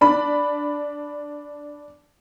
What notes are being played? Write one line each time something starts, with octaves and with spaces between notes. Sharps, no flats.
D4 B5